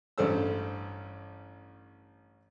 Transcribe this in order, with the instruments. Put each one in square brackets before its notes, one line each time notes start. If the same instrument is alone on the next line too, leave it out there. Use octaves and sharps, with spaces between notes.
[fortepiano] A1 G2 A4 C5 E6